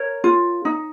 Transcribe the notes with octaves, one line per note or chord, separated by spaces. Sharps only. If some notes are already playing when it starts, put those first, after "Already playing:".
Already playing: A#4 C#5
F4
D#4